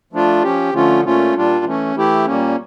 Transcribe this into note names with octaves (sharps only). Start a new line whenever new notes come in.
F3 A3 D4 F4
F3 C#4 G4
D3 F3 A3 C#4 F4
A#2 A3 C#4 F4
A#2 G3 D4 F4
E3 A3 C#4
E3 A3 E4 G4
A#2 G3 A#3 C#4